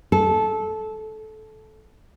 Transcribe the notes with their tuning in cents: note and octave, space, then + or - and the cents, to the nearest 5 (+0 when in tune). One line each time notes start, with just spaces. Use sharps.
A4 -15